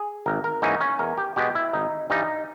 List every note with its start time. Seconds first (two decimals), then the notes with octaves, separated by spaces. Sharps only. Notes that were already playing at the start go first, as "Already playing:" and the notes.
Already playing: G#4
0.26 G#1 A#4
0.44 A#4
0.62 G#2 E3 A#3 C#4 D#4
0.81 C#4
0.99 E2 A#4
1.18 G4
1.36 B2 G#3 B3 G4
1.55 E4
1.73 G#1 D#4
2.10 G2 E3 G3 D#4